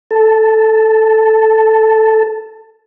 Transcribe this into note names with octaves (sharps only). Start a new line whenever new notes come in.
A4 A5